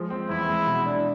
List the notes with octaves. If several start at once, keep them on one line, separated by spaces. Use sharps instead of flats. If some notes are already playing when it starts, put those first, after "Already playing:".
Already playing: F3 G#3
C4
E2 E4
G#3
B2
D4